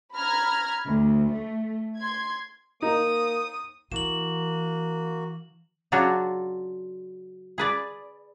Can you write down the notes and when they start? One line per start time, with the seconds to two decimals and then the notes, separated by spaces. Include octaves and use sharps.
0.15 A#5 B5 F6 G#6
0.85 D2
1.31 A3
1.98 C6 G#6
2.82 A#3 D#4 D#6
3.92 E3 A#3 F#4 E7 F#7
5.92 C#3 F#3 D4 F4 F#4 C#5
7.58 G#4 B4 D5